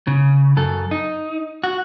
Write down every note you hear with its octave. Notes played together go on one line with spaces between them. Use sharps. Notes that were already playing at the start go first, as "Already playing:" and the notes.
C#3
F#2 A4
D#4
F#4